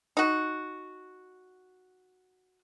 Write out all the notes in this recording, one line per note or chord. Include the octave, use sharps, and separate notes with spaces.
D#4 F#4